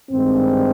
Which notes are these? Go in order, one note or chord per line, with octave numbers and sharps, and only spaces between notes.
G2 D#3 G#3 C4